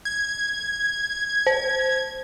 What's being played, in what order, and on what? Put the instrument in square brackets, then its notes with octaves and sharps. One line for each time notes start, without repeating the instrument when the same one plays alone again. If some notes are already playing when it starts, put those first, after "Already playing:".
[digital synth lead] G#6
[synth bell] C5